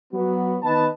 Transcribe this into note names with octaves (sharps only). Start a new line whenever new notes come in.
F#3 B3 F#4
D#3 B3 B4 D#5 A5